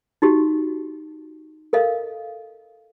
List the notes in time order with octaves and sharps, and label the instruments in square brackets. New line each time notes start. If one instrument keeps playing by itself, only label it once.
[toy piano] D#4 F#4 G4
A4 A#4 D#5 F5